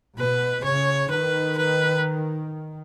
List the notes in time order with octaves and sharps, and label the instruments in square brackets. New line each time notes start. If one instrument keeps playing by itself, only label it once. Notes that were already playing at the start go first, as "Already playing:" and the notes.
[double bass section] B2 [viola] B4
[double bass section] C#3 [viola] C#5
[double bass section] D#3 [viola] B4
[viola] B4